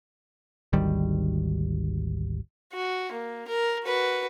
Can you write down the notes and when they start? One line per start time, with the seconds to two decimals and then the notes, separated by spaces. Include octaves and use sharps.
0.73 G#1 D2 D#3 G3
2.73 F#4
3.12 A#3
3.48 A#4
3.85 F#4 B4